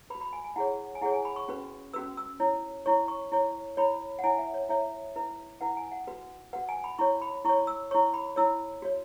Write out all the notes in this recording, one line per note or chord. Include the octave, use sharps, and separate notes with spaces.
F#4 B4 B5
B5
G#5
G#5
E4 G#4 C#5 F#5
G#5
E4 G#4 C#5 F#5
G#5
B5
C#6
C#4 F#4 B4
C#4 F#4 B4 E6
E6
E4 C#5
E4 C#5 C#6
C#6
E4 C#5
E4 C#5 B5
F#5
E4 C#5 G#5
E5
C#5
E4 C#5 E5
E4 B4
E4 B4 F#5
G#5
F#5
F#4 B4
F#4 B4 F#5
G#5
B5
E4 C#5 C#6
B5
E4 C#5 C#6
E6
E4 C#5 C#6
B5
E4 C#5 E6
F#4 C#5